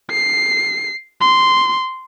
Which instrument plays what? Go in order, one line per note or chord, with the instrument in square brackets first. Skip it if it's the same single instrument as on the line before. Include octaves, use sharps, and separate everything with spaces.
[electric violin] C7
C6